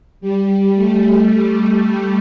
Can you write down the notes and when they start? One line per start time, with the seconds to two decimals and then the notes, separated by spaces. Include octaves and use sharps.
0.21 G3
0.75 A3